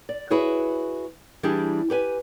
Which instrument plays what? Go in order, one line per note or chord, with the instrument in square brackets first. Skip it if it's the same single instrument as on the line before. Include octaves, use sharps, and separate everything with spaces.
[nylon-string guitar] D5
E4 F#4 G#4 B4 C#5
E3 G3 D4 G4 G#4
G4 B4 G#5